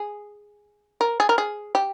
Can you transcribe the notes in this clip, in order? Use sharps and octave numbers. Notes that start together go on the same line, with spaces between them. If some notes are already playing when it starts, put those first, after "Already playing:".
Already playing: G#4
A#4
G#4
A#4
G#4
G4